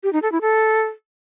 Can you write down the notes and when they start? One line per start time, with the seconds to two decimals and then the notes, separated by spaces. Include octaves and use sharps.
0.03 G4
0.13 D#4
0.22 A4
0.32 E4
0.41 A4